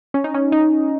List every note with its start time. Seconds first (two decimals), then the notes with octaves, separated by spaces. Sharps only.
0.14 C#4
0.24 D#4
0.34 C#4
0.52 D#4